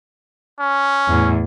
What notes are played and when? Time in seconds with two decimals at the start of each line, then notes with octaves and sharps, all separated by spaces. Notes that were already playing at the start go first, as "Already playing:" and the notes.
0.59 C#4
1.08 E2 A2